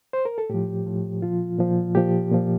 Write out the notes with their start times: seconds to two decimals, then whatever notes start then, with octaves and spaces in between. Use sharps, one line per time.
0.13 C5
0.25 A#4
0.38 A4
0.50 A2 F3 G4
0.86 A2 F3
1.22 A#2 F3 F4
1.58 A#2 F3
1.95 A#2 F3 G4
2.32 A#2 F3